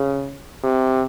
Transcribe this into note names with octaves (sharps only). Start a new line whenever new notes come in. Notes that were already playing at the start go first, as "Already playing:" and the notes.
Already playing: C#3
C3